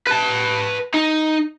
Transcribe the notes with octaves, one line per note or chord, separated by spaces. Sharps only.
B4 A5
D#4